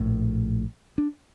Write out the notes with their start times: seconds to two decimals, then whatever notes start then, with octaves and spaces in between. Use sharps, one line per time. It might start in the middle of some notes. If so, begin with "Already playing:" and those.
Already playing: A#1 A2
0.98 D4